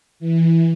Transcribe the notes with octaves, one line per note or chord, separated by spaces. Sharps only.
E3